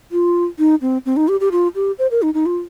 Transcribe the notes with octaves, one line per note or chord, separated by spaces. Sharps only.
F4
D#4
C4
C4
D#4
G4
G4
F4
G4
C5
A#4
D#4
D#4
F4